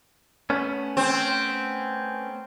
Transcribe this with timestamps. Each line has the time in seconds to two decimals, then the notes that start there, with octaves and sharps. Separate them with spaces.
0.50 A3 B3 C#4
0.97 C4